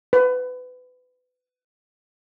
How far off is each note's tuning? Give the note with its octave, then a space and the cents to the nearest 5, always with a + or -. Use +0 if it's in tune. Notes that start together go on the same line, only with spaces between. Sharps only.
B4 +25